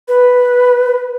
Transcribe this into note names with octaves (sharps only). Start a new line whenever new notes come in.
B4